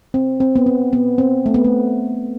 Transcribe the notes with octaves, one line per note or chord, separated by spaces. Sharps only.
C4
C4
B3
C4
B3
C4
A3
B3
A3